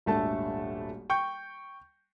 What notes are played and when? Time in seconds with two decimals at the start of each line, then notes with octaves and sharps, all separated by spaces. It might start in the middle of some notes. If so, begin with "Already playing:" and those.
0.06 D#1 G#1 A3 D4 A4 A5
1.10 G5 C#6 G6